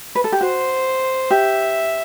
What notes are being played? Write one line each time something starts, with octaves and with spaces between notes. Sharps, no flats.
B4
A4
G4
F#4 C5
G4 E5